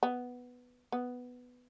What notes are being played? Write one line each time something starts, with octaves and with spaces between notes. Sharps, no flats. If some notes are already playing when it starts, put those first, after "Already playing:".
B3
B3